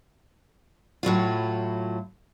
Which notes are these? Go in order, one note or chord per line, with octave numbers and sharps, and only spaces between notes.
A2 F#3 E4 F4